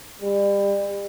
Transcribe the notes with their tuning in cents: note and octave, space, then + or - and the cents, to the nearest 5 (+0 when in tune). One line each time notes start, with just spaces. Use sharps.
G3 +35